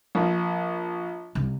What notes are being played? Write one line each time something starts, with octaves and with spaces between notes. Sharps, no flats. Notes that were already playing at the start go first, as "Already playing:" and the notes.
A#1
C2